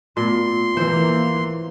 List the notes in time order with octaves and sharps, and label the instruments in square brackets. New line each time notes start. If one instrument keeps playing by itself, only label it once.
[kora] A#2 [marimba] A3 B3 F4 [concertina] C6
[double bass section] E3 A#3 [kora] C5